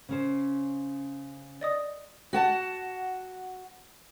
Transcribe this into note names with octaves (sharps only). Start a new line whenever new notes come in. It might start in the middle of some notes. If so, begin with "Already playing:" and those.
C#3 C#4 C5
D5 D#5 D#6
F#4 F#5 A5